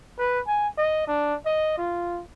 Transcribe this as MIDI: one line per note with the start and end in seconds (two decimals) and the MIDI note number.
0.19 0.40 71
0.47 0.68 80
0.78 1.06 75
1.07 1.35 62
1.45 1.75 75
1.78 2.21 65